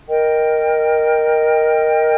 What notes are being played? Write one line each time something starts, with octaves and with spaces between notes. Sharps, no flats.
A#4 D#5 G5